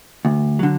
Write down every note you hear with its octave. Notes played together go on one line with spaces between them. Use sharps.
D2
D3 F#3